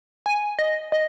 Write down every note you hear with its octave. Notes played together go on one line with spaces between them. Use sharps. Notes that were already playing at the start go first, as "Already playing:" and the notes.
G#5
D#5
D#5